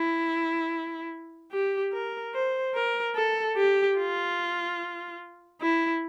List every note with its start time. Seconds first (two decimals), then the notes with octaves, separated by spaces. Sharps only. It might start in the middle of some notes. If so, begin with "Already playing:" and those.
Already playing: E4
1.52 G4
1.93 A#4
2.34 C5
2.75 A#4
3.16 A4
3.57 G4
3.98 F4
5.61 E4